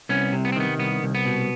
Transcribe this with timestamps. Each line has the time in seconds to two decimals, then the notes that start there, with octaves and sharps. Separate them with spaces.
0.09 C2 B3 C#4
0.32 C3
0.45 B3
0.52 C4
0.56 D#3 B3
0.79 C2 B3
1.03 C2
1.15 B3
1.26 B2